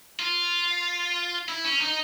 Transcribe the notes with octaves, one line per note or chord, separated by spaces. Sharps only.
F4
E4
C#4
D#4